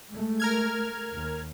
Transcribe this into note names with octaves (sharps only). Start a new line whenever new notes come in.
G#3 A3
A#4 F6 G#6
D#2